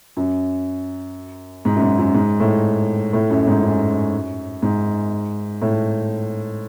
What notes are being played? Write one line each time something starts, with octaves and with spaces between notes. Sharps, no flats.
F#2
G#2
F#2
G#2
F#2
G#2
A2
A2
F#2
G#2
F#2
G#2
A2